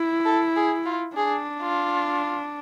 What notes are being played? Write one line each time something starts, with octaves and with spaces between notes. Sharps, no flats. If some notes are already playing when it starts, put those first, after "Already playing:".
Already playing: E4
A4
G#4
F4
D4 G#4
F4